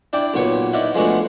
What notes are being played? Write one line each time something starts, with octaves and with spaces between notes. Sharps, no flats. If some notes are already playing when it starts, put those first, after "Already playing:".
D4 E4 D5 G5
B1 A#2 B3 C#5 C#6
D#4 E4 A#4 D5 E5 F#5
F3 G#3 A3 B3 D4 F#4